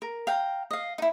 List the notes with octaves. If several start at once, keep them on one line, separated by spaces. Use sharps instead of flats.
A#4
F5 G5 A#5
D#5 F5
D#4 E4